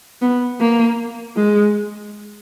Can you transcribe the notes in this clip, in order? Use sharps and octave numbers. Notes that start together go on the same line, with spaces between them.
B3
A#3
G#3